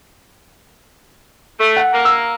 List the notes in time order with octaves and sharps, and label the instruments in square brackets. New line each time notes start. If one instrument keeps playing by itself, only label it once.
[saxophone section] A3
[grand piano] F#5
[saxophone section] A#3
[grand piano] E6